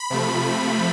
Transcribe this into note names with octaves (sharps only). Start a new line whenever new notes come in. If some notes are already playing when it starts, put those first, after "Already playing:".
Already playing: B5
C3 F3 A3
B5